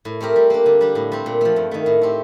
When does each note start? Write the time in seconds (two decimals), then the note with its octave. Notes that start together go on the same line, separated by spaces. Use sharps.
0.05 A2
0.21 A3 C4 G4 A#4
0.36 G3
0.50 A#3 D4
0.66 D3
0.81 G3 D4
0.95 A2
1.12 G3 C4
1.26 A#2
1.41 F3 A3
1.56 G2
1.71 D#3 A3
1.86 A2
2.01 A3 C4 G4